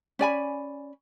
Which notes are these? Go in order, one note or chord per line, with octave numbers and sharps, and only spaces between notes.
C#4 D5 G#5 B5